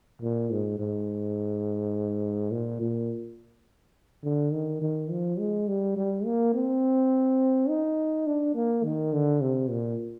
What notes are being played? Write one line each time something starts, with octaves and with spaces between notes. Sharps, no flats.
A#2
G#2
G#2
A#2
A#2
D3
D#3
D#3
F3
G#3
G3
G3
A#3
C4
D#4
D4
A#3
D#3
D3
C3
A#2